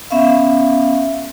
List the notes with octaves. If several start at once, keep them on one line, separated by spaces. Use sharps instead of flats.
B3 C#4 E5 F5